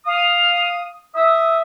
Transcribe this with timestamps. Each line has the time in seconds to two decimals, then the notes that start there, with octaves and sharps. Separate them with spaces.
0.06 F5 D#6
1.14 E5 D#6